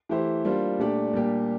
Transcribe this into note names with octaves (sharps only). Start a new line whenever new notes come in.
E3 A3 E4 G4 C5
G3 A#3 D4 F4 C5
A#2 A3 D4 G4 D5
A#2 G3 A#3 D4 G4